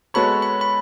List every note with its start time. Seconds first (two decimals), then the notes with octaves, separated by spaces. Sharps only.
0.14 G#3 B3 F#4 A4 C#5 B5
0.42 B5
0.61 B5